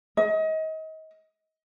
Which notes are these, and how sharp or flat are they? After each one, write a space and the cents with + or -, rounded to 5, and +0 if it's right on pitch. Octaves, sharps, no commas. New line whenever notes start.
D#5 +30